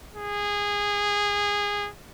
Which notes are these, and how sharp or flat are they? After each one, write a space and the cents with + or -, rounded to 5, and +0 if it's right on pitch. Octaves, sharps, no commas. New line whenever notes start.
G#4 -20